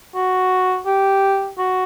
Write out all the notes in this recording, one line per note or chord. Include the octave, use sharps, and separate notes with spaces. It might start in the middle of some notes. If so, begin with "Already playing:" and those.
F#4
G4
F#4